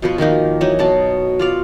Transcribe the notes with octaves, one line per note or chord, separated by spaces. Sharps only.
B2 F3 B4
D#3 F3 A#3 D#4
E3 F#3 D#4
B2 F#3 A5
F4 D5 F5